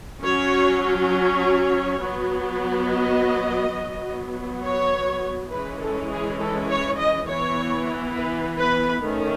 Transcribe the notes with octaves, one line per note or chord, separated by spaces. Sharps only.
F#3 C#4 C#5
C#5
F#3 B3
D#5
F#3 B3
C#5
E3 G#3 C#4 B4
A4
G#4
A4
C#5
D#5
E3 B3 C#5
B4
B4
D#3 A3 C#4